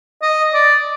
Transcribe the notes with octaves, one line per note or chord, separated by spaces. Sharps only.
D#5
D5